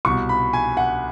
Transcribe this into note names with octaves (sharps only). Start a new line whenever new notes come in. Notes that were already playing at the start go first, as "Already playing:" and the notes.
C2 B2 C#6
B5
G#5
F#5